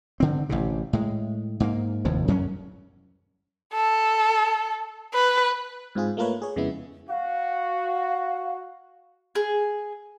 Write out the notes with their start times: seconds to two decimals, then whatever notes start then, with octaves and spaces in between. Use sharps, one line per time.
0.20 G#2 D3 C4
0.49 A1 A2 C3
0.93 A2 G#3
1.60 G#2 A3 A#3
2.05 F1 D#2 A2 F3
2.28 F#2 F#3 G#3 C#4
3.74 A4
5.14 B4
5.95 G#2 C4 F4 G#4
6.17 A3 A#3 F4 A#4 B4 C#5
6.42 G#4 C#5
6.56 F2 C#3 G#3 B3 E4
7.09 F#4 F5
9.35 G#4